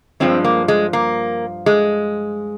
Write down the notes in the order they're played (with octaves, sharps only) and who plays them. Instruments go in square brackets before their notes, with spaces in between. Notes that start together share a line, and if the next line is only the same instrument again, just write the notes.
[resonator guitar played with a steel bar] G2 F3 G#3 C4
A#3
G#3
A#3
G#3